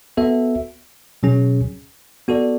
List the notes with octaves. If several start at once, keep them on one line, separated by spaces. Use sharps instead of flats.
B3 F#4 A4 E5
B2 F#3 C#4 G#4
B3 F#4 A4 D5